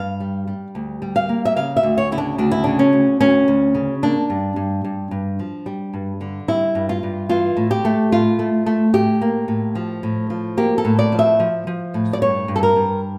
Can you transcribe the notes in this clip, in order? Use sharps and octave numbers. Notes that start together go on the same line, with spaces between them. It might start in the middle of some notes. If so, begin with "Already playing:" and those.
Already playing: G2 F5
G3
G3
D2
G3
F5
A#3
E5
C#3 F5
E5
D2
C#5
C#3 E4
D4
D2 D4
E4
C#3 D4
C#4
D2
D2 C#4
D2
C#3
A#3 D4
G2
G2
G2
G2
F3
G3
G2
D3
G3 E4
G2
F4
G2
E3 F4
A2
G4
A3
A2 F4
A3
A3
A2 G4
A#3
A2
F3
A2
F3
A#3 G4
A4
A2
D5
F3
E5
F3
F3
A2
D5
G2 C#5
G2
A4
A#4
G2